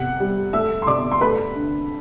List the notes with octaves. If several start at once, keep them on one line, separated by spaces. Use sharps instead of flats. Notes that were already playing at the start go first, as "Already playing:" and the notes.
Already playing: C3 F#5 F#6
G3
A3 E5 E6
C6
C3 D5 D6
C6
A3 B4 B5
D3